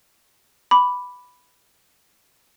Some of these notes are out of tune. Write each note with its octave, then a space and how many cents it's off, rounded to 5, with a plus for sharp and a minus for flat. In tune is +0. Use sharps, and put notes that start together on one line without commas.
B5 +0 D6 -5